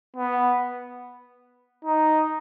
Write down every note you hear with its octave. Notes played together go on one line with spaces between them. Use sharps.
B3
D#4